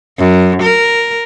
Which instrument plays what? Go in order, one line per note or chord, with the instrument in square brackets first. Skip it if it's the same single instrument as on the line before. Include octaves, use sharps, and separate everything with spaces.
[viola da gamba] F#2
A#4